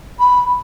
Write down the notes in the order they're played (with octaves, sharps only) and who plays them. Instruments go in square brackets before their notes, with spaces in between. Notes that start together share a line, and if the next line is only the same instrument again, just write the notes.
[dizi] B5